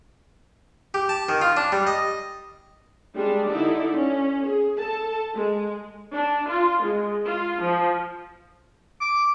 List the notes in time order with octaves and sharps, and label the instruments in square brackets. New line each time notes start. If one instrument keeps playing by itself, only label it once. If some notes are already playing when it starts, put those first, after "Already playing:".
[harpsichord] G4
A5
D#3
F4
D4
G3
D#5
[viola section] G3 G#3 D4
D3 D#4 E4 D5
C#4
G#4
A4 A5
G#3
D4
F4
G#3
F4
F3
[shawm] D6